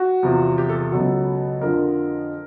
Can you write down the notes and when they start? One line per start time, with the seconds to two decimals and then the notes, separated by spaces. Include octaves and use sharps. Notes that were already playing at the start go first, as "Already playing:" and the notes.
Already playing: F#4
0.23 E2 C3 F3
0.58 G4
0.69 A4
0.80 A4
0.92 C#2 B2 F#3 A4
1.61 F2 D3 F3 A#4